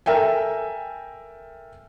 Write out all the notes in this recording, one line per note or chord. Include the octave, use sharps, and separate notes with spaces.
A4 A#4 E5 G5 G#5